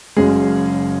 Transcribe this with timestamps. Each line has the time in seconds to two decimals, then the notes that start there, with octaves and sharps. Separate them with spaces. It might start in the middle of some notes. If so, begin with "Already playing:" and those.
0.16 F#1 F#2 C#3 G#3 G#4